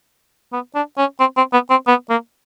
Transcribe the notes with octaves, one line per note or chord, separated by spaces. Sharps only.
B3
D4
C#4
C4
C4
B3
C4
B3
A#3